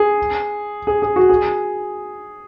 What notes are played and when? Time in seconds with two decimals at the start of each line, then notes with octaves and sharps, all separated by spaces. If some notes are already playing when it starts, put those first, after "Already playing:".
Already playing: G#4
0.87 G#4
1.02 G#4
1.16 F#4
1.29 G#4